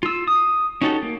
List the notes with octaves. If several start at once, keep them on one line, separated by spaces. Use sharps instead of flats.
F4 E6
D#6
C#4 D#4 F#4 G4 A4
A#3